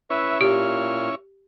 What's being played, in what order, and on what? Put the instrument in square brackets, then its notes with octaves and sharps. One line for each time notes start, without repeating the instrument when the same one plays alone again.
[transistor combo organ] C#4 E4 C#5 [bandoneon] B4 E5
[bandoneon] A#2 F6 [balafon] G4